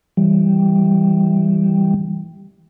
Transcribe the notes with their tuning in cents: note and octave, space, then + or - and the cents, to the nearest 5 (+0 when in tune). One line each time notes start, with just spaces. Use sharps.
E3 +0 G3 +0